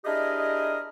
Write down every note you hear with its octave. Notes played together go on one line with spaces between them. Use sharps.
D4 E4 G4 G#4 A#4 D#5